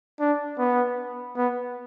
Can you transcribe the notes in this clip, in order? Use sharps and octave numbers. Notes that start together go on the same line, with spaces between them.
D4
B3
B3